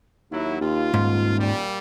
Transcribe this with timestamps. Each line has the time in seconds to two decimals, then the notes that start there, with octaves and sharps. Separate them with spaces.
0.31 D#2 F#3 E4
0.61 D#2 F4
0.94 D#1 G#2
1.38 A#2 G3